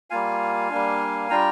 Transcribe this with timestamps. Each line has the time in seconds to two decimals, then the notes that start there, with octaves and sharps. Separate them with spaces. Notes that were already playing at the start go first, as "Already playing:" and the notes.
0.10 G3 A#3 F4 F5 G#5
0.70 G3 A#3 D4
1.30 G3 D4 F4 G5 A#5